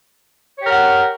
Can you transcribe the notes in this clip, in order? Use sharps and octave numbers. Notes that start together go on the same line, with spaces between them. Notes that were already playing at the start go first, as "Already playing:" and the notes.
G4 A#4 C#5 F#5